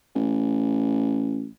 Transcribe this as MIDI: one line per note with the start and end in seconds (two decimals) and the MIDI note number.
0.15 1.47 33